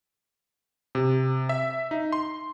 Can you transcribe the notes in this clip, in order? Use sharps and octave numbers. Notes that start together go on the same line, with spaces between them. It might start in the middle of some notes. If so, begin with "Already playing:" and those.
C3
E5
D#4
C6